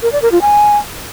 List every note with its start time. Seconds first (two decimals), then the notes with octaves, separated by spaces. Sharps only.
0.03 A#4
0.12 D5
0.22 A#4
0.32 F4
0.42 G#5